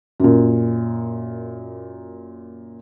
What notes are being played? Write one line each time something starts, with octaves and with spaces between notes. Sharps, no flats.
F#2 A#2